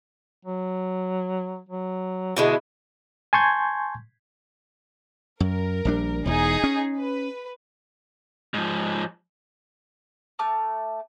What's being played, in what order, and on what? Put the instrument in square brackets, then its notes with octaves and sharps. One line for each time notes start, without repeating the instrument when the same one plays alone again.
[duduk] F#3
F#3
[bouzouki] B2 D3 G#3 [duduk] E4
[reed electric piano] G#5 A5 C6 C#6 G6 G#6
[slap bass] F#2 [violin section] A#4
[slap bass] A#1 G3 D4
[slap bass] E1 E2 [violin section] D#4 G#4
[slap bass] C#4
[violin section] B4
[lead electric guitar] G#2 F3
[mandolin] A3 A5 D6 F6